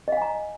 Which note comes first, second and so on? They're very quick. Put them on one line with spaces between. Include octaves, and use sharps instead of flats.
D#5 F5 G#5 A#5